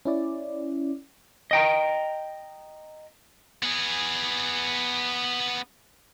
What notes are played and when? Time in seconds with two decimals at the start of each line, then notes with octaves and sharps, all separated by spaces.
0.05 C#4 E4 D5
1.51 D#5 G5 A#5
3.63 B3 G#4